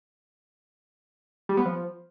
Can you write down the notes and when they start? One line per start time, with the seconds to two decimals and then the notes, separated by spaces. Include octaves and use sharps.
1.49 G3
1.57 B3
1.65 F3